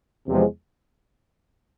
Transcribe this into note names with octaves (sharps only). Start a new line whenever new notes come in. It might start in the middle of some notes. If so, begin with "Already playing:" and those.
E2 C3 F3 G#3